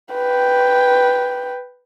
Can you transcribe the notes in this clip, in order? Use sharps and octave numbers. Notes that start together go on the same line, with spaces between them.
B4 G5